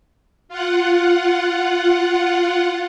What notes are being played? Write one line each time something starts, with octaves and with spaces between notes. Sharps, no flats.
F4 F#5